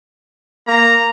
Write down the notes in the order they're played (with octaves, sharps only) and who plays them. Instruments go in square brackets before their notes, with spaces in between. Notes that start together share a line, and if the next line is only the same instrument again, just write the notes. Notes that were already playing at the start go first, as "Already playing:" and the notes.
[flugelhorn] A#3 [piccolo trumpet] A#5